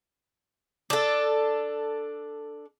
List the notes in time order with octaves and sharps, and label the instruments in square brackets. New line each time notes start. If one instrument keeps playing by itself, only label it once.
[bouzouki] D4 A4